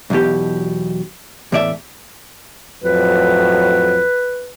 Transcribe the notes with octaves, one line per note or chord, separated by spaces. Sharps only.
B1 E2 B2 G4
E2 A2 D5 E5
F2 A2 F#3 B4